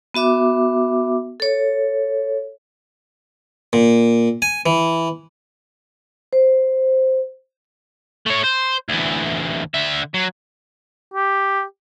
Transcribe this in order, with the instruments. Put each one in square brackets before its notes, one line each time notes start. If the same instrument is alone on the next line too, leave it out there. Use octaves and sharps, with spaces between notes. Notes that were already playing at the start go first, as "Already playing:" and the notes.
[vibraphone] B3 F#4 E5 D6
A4 C#5
[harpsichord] A#2
G#5
E3
[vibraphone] C5
[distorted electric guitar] A3 C#5
C5
D2 E3
D3 E5
F#3
[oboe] G4